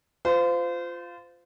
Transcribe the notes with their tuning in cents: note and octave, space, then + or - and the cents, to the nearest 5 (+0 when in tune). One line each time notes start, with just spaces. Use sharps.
F4 +0 C5 -30